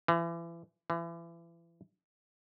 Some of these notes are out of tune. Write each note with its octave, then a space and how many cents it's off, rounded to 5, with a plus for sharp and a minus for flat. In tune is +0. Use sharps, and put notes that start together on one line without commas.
E3 +35
E3 +35